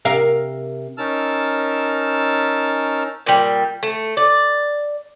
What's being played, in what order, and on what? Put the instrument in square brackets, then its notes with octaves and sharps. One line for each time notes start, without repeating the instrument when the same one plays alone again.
[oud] C3 A#4 F5
[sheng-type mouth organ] C#4 D#4 A#4 A5 E6 F6
[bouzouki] A#2 G3
A3
D5